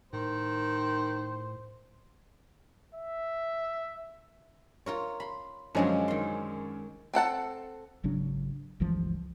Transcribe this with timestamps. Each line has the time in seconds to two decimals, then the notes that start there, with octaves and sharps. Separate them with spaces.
0.13 A2 D#3 C5
2.95 E5
4.86 F4 A#4 C#5
5.20 B5 C6
5.75 F#2 D3 F3 G#3 C#4 G#4
6.08 D#3 C6
7.13 C4 A4 F#5 A5
8.04 G#1 C#3 F#3 D4
8.80 G1 C#2 E3 F3